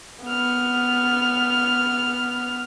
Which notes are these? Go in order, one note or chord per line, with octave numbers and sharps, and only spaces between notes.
B3 F6